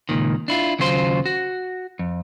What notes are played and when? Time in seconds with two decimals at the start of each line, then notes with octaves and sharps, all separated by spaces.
0.09 C#2 F#2 A#2 D#3
0.48 D4 E4 F4
0.79 D#2 C#3 F#3 F4 C5 C6
1.26 F#4
1.99 F2